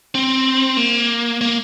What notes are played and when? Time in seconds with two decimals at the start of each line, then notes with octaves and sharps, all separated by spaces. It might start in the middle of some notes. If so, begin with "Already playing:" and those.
0.15 C4
0.77 A#3
1.41 A#3